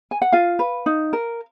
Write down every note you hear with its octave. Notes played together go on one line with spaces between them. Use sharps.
G#5
F#5
F4 F5
B4
D#4
A#4